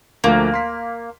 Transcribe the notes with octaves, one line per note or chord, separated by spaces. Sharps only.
D2 F3 A3 A#3
C6 B6